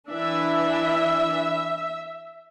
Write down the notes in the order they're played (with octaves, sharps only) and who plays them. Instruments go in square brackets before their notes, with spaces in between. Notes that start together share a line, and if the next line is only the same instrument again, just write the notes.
[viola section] E3 D4 E5